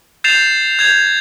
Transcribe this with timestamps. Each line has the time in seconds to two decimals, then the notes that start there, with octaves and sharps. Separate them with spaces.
0.24 G6 A6 C7 E7 F7
0.79 G6 G#6 F7